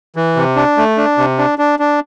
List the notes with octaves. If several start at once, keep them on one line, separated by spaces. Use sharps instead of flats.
E3
C3
D4
A3
D4
C3
D4
D4
D4